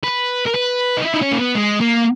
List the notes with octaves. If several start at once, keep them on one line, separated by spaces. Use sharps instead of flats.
B4
A#4
B4
D#4
E4
D#4
C#4
A#3
B3
G#3
A#3